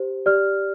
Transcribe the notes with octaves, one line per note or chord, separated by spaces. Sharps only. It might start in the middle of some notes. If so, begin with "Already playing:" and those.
Already playing: G4 C5
G4 D5 F6